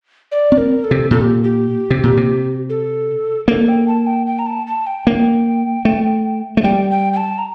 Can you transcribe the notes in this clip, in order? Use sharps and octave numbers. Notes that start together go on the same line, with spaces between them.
D5
C4
A#4
A4
C3
A#2 A4
G4
G4
C3
A#2
C3
A4
A#3 A4
G5
A5
G5
G5
A#5
A5
A5
G5
A#3
A3
A3
G3 G5
G5
G5
A5
A#5